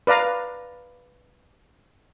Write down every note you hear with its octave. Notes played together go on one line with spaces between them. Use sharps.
B4 D5 F5 A#5